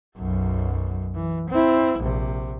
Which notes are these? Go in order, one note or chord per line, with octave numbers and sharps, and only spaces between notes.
B1 F#2
E3
C4 E4
A#1 C3